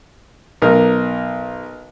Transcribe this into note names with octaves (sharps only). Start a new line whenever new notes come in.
B1 A#4